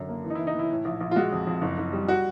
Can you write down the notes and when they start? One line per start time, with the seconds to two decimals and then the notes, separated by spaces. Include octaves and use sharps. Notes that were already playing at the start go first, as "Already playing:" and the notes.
Already playing: F#2 D3
0.09 A#3
0.24 E3
0.30 D#4
0.35 E3 E4
0.47 D#4
0.55 E3 E4
0.71 A2
0.85 A#1
1.00 A#1
1.11 F4
1.16 G#3 F#4
1.32 F2
1.47 F2
1.62 F#1
1.78 F#1
1.93 G3
2.08 F#4